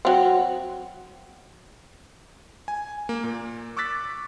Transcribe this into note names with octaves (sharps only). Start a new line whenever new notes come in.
F#3 C4
G#5
A#3
A#2
C#6 D6 E6 F#6 A6 B6